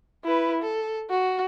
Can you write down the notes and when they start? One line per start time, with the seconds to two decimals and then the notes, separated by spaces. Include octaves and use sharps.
0.24 E4 B4
0.62 A4
1.10 F#4